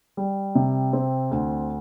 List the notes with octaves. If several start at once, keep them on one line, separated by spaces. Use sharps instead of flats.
G3
C3
C4
D2